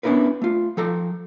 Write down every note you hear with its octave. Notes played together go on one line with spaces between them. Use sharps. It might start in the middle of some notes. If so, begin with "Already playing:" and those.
B3 C#4 D4 E4 A#4 B4
A3 F4
F3 A4 A#5